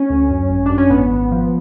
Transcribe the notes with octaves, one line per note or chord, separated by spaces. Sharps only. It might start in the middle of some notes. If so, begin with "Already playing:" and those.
Already playing: C#4
D2
F#2
G#1
F#2 D4
C#4
G#1 B3
G#1
F3